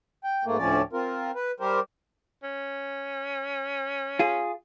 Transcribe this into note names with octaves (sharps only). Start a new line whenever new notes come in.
G5
G#2 A3 A#3
D2 A2 F3 C#4 D5
C4 F4 A#4
B4
G3 G4 A#4 C5
C#4
F4 G#4